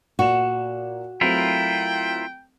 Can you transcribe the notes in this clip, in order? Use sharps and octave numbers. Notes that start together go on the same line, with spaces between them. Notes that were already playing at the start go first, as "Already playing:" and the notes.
A#2 F#4 E7
F#3 A3 C4 E4 F4 A#4 G5